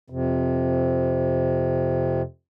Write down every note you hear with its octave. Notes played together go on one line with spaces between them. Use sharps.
F2 C3